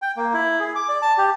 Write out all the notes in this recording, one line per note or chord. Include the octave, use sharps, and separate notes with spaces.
G5
A#3
E4
G#4
D6
D5
A5
G4